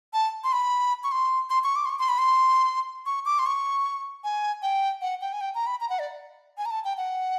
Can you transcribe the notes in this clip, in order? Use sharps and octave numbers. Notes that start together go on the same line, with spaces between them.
A5
C6
B5
C#6
C6
C6
C#6
D6
C6
C#6
C6
B5
C6
C#6
D6
C6
C#6
G#5
G5
F#5
G5
G#5
G5
A#5
B5
A#5
F#5
D5
G#5
A#5
A5
G5
F#5